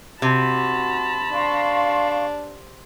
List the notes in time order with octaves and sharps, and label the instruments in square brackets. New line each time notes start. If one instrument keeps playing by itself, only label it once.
[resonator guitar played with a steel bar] C3 [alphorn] F#4 [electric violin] A5 B5
[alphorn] D4 [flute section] F5 C6 C#6